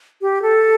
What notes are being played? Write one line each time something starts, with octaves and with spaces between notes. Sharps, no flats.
G4
A4